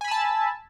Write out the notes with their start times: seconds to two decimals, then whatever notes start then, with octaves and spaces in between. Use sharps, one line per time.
0.01 G#5
0.04 B5
0.08 E6
0.11 A5